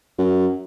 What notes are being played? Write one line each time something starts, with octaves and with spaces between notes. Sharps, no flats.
F#2